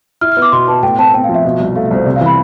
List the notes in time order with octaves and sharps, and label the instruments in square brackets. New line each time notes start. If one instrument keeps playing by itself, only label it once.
[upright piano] E4 [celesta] F6
[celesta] F6
[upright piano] B3
[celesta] D6
[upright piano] B2 [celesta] C6
[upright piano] B3 [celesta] A5
[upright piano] A2 [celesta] G5
[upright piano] C4 [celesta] A5
[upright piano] C4 [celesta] G5
[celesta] F5
[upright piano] F3
[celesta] E5
[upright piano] B2
C2
[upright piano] A3 [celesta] F5
[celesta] E5
[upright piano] C2 [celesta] C5
[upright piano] C3 [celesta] D5
[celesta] F5
[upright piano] E3 [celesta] B5